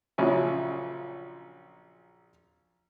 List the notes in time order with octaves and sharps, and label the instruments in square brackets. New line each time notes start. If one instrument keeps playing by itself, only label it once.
[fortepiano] A#1 C#3 F3 F#3 E4 G#5